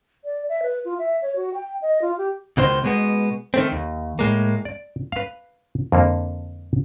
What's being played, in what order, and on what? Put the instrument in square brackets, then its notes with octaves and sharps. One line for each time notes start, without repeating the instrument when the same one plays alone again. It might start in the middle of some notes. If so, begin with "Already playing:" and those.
[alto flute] D5
E5
B4
F4
E5
C#5
F#4
G5
D#5
F4
G4
[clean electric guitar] C#2 B2 D#3 C5
B2 G#3 B3
D#3 A3 C4
D#2
A2 G#3 A#3
[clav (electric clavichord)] D5
B4 F5
F2 D3 A#3